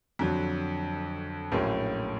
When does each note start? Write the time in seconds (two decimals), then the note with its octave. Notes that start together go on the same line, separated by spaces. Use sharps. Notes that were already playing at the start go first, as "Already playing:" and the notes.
0.19 F2 D3 F#3
1.52 A#1 A2 F#3 A#3 C#4